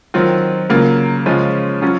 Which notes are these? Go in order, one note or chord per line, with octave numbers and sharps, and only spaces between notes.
D#3 F#3 C4 F4
C#3 F#3 A#3 F4
C#3 F3 G#3 C#4 F4
F#3 C#4 F4